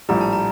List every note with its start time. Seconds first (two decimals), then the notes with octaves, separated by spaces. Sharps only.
0.09 A#1 A2 G3 A#5
0.21 A5
0.33 A#5